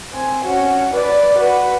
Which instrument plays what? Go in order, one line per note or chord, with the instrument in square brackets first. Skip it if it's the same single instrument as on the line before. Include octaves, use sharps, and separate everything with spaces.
[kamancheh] C4 G#5
C#4 F#4
B4 D5
F#4 B4